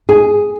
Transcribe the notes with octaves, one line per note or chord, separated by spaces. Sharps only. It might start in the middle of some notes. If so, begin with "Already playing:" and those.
G#4